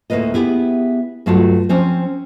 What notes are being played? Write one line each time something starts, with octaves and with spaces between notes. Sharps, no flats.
D2 A2 A3 A#3 B4 D#5
B3 E4 G4 G#4
G2 F#3 A3 F4 F#4 A5
F3 C4 C#4 C5